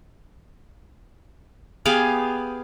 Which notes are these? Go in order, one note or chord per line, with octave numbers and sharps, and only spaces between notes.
B3 G4 G#4 F5